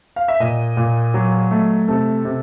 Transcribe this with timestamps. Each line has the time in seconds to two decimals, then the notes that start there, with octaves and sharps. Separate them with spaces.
0.16 F5
0.28 E5
0.40 A#2 D#5
0.77 A#2
1.14 F#3
1.51 A3
1.88 C3 A4
2.25 C3